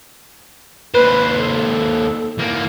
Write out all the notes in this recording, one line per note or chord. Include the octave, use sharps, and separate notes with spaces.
D#2 B4 C5
A4
E2 A#3